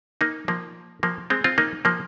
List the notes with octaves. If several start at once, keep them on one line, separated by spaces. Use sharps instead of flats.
A#3 D#4
F3 A#3
F3 A#3
G#3 C4
C4 F4
A#3 D#4
F3 A#3